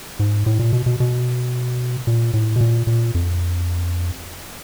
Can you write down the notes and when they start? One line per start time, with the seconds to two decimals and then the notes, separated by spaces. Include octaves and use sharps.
0.19 G#2
0.46 A2
0.59 A#2
0.73 B2
0.86 B2
1.00 B2
2.07 A#2
2.34 A2
2.56 B2
2.61 A#2
2.87 A#2
3.15 F2